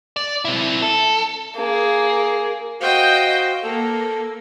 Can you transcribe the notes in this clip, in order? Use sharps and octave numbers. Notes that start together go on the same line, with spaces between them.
D5
C4 E4
A4
A#3 G#4
F#4 C5 D#5 F5 G5
A#3 A4